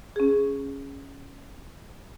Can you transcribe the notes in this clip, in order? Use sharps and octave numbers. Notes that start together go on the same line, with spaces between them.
C#4 G#4